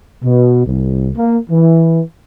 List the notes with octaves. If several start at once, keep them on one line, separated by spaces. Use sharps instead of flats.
B2
C2
A#3
E3